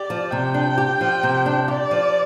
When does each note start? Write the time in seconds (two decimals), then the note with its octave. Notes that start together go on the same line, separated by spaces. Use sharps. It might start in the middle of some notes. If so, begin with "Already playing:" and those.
Already playing: G4 D5
0.10 F3
0.31 C3 G5
0.54 D4
0.78 G4
1.01 F3
1.23 C3
1.46 D4
1.68 G4 D5
1.91 F3